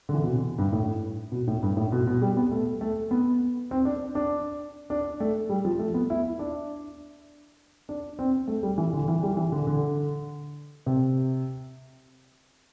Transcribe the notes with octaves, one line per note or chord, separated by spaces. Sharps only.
D3
E3
B2
C3
G2
A2
B2
A2
G2
A2
B2
B2
G3
B3
A3
A3
B3
C4
D4
D4
D4
A3
G3
F3
A3
B3
E4
D4
D4
C4
A3
G3
E3
D3
E3
G3
E3
D3
D3
C3